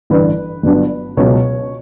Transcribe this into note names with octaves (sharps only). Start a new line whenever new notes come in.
A1 G2 D3 B4
G1 G2 F#3 B3 D4
C#2 B2 F#3 C#5